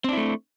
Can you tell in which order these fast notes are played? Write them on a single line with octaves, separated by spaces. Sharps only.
C4 D4 E4 A3